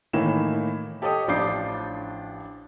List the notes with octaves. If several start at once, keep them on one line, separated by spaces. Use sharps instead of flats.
A2 D#3 E3 A#3 E7
G4 A4 C#5 D#5 G5 D#6
A1 F3 D4 D6 G6 C7